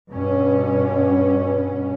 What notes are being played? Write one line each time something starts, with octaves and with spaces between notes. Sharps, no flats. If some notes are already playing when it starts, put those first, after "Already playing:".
G2 B2 C#4